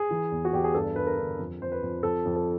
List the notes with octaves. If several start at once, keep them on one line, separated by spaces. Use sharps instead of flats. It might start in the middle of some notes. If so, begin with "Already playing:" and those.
Already playing: G#4
E3
E2
F#4
E2 G4
G#4
G2 A4
G2 B4
A#4
D3
F2
F2 C5
B4
F2
F2 A4
F2
A4